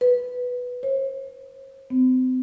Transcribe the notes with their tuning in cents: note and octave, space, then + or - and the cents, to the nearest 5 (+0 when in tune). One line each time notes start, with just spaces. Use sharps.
B4 +0
C#5 -45
C4 -40